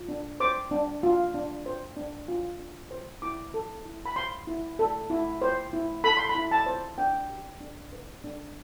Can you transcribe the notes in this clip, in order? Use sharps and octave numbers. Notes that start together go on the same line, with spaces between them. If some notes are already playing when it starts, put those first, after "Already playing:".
Already playing: F4
D4
C5 D6
D4
F4
D4
C5
D4
F4
D4
C5
E4 D6
A4
E4
B5
C5 C6
E4
A4
E4
C5
E4
A4 B5
C6
B5
E4
A5
C5
D4 G5
G4
D4
B4
D4